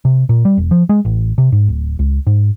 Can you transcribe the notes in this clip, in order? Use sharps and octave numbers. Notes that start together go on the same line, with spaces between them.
C3
A#2
G3
E1
F3
G#3
A1
C3
G#2
D1
C#2
G#2